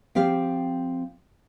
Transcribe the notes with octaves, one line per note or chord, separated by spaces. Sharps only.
F3 C4 G4 F5